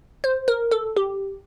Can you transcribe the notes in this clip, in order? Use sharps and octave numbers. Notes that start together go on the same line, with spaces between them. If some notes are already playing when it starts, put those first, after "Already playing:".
C5
A#4
A4
G4